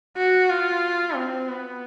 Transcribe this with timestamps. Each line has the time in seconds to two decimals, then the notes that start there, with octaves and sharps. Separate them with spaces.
0.17 F#4
0.50 F4
1.15 C4
1.48 B3